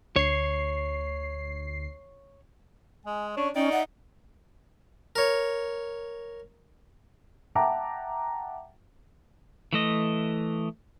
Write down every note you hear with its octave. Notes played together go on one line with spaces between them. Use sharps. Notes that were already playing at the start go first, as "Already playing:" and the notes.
D2 C#5 C7
G#3 G#5
C#4 D4 C#6
C#4 D#4 D5 G5
E5 F#5
A#4 C#5
E5 F#5 G5 A5 A#5 D6
E3 A3 D#5